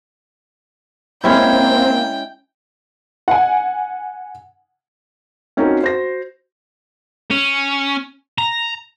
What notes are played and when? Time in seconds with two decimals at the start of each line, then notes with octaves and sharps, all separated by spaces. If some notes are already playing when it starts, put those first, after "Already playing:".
1.24 G#3 A#3 C4 C#4 E4 G5
3.28 F#5 G#5
5.57 C4 C#4 D#4 F4 F#4 A#4
5.81 F#4 C5 A#6
7.31 C#4
8.38 A#5